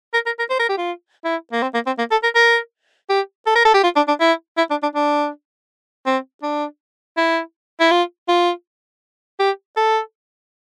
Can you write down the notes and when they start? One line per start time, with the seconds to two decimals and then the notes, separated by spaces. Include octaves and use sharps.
0.14 A#4
0.26 A#4
0.39 A#4
0.50 C5
0.59 A#4
0.69 G4
0.78 F4
1.25 E4
1.52 A#3
1.62 C4
1.74 A#3
1.86 C4
1.98 A#3
2.11 A4
2.23 A#4
2.35 A#4
3.09 G4
3.46 A4
3.56 A#4
3.65 A4
3.74 G4
3.83 F4
3.96 D4
4.08 D4
4.20 E4
4.57 E4
4.70 D4
4.83 D4
4.95 D4
6.06 C4
6.43 D4
7.17 E4
7.80 E4
7.91 F4
8.28 F4
9.39 G4
9.77 A4